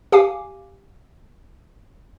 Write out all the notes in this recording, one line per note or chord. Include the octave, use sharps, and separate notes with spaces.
G4 F5 G#5 D6